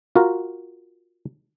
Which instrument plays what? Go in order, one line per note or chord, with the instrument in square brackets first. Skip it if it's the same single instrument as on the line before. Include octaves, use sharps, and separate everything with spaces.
[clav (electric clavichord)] F4 F#4 A#4